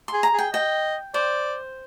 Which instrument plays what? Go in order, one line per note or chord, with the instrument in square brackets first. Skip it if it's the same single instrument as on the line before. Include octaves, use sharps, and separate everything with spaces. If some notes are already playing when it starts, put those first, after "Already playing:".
[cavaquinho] C6
[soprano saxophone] G#4
[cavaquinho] A#5
[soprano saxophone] G#4
[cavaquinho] G5
[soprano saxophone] D#5 [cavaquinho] G5
[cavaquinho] C5 [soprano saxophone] D5